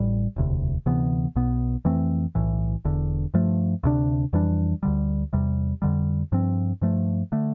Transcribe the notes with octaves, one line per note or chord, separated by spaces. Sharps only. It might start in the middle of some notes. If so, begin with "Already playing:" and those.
Already playing: A1 A2 G3
E1 D2 C3
D2 C3 E3 B3
B1 B2 B3
F2 E3 A3 C4
B1 A2 E3
E1 E2 D3
G2 F3 A3
D2 C3 G3 D4
F2 E3 G3 D4
D2 D3 G3
E2 C3 G3
F2 D3 G3
G2 F3 C4
G2 F3 A3
D3 A3